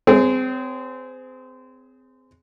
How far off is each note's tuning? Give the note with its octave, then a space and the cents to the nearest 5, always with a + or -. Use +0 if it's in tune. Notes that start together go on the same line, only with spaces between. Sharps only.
C4 -25 G#4 +5 C#5 +0